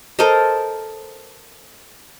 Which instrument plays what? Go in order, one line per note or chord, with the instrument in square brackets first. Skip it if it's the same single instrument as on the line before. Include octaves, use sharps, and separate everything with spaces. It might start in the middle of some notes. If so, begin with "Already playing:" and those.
[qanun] A4 A#4 C5 D#5